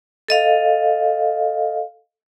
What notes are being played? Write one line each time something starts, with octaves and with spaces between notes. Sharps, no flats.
A4 D#5 F5